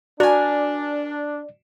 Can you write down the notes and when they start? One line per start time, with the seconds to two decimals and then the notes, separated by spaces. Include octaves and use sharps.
0.20 D4 F#4 A#4 D5 G#5